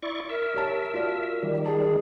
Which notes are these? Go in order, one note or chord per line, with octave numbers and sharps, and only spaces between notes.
E4 D5 C#6
A#4 E5
G4 C#5 A5
F4 F#4 D5
D#3 G3
G#4 A5